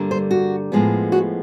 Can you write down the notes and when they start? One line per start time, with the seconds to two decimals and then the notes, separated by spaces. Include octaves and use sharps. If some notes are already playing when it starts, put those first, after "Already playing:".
Already playing: G2 D3 G3 A#3
0.11 C5
0.31 F#4
0.72 A2 F3 G#3 B3
1.12 F#4